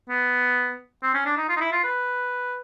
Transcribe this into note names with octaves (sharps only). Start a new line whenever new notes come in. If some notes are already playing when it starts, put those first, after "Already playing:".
B3
C4
C#4
D4
D#4
F4
D#4
E4
F4
B4